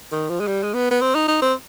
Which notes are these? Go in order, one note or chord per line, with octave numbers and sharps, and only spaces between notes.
D#3
F3
G#3
G3
G#3
B3
B3
C4
D#4
D#4
C4